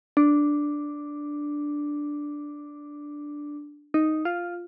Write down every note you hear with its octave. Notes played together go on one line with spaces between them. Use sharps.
D4
D#4
F4